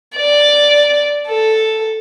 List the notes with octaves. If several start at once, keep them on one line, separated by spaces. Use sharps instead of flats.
D5
A4